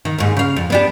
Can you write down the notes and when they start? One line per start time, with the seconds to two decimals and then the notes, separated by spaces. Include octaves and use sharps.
0.05 D#3
0.18 D#2 G#2
0.37 C#3 F5
0.56 F2
0.70 B3 D4 G4